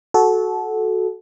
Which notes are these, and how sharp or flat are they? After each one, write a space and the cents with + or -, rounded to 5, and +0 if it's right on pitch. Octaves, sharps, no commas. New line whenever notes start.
F#4 +0 A4 -20